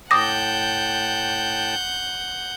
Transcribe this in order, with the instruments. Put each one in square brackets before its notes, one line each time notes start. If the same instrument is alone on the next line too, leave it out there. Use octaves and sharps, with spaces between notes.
[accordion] A2 G5 A5 [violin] F#5 G6 [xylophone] D6 D#6 A#6